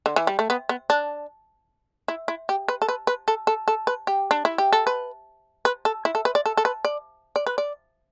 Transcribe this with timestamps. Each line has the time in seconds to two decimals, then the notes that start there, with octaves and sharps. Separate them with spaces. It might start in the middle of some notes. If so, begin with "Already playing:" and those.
0.06 D3
0.16 E3
0.27 G3
0.39 A3
0.50 B3
0.69 B3
0.90 D4
2.08 E4
2.28 E4
2.49 G4
2.68 B4
2.82 A4
2.89 B4
3.07 B4
3.28 A4
3.47 A4
3.68 A4
3.87 B4
4.07 G4
4.31 D4
4.45 E4
4.58 G4
4.73 A4
4.87 B4
5.65 B4
5.85 A4
6.05 E4
6.15 A4
6.25 B4
6.35 D5
6.46 A4
6.57 A4
6.65 B4
6.85 D5
7.36 D5
7.47 B4
7.58 D5